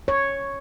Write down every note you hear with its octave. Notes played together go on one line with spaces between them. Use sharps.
C#5